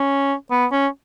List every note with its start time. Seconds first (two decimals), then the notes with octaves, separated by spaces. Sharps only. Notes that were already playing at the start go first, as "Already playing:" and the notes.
Already playing: C#4
0.51 B3
0.72 C#4